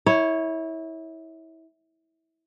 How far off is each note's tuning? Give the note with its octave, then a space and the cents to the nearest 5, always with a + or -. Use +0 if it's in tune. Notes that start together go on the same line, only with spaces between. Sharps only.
E4 -25 C#5 +0